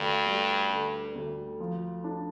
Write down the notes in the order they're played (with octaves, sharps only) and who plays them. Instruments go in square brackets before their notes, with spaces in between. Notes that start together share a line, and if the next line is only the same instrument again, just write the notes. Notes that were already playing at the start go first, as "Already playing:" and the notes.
Already playing: [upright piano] D2 [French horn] G2
[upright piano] G3
D3
D2
F3
D4